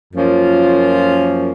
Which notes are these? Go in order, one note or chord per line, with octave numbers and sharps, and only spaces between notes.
F#2 F3 A#3 C#4 F4